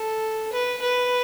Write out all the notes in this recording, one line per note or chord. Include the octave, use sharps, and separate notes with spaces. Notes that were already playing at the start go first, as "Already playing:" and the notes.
Already playing: A4
B4
B4